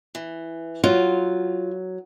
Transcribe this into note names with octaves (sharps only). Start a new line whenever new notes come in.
E3
F#3 F4